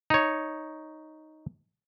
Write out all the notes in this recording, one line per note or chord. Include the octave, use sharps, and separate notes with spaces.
D#4 C#5